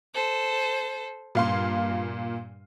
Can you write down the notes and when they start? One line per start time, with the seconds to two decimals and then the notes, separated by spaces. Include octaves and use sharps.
0.14 A4 C5
1.35 G2 A#2 F5 C6